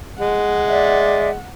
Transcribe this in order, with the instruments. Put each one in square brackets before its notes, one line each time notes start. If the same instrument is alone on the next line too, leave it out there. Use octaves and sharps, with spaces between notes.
[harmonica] G#3 [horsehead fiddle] F#5
[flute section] D5 E5